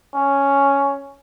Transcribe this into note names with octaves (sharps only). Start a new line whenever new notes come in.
C#4